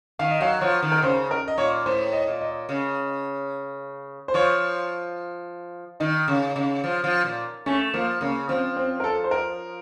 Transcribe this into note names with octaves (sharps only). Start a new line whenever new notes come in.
D#3 F5
D#5
F#3 F5
F3 C#5
D#3
A#4
C#3 C5
A#4
D#5
A#2 C#5
A2 C5
D#5
A#2
D#5
C#3
C5
F3 C#5
D#3 D#4
C#3
C#3
F3
F3
A#2
A3 C#4
F3 A#3
C#3 A#3
F3 C4
C4
A#4
A4
C5
A#4